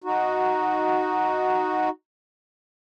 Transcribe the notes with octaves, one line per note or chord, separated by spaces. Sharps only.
D#4 F#4